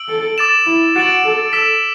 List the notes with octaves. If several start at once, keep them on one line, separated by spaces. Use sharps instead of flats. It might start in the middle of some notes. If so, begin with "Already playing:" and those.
Already playing: E6 D7 F#7
A4
D6 A6 E7
E4
F#4 A6 D7 F#7
A4
A4 E6 B6 E7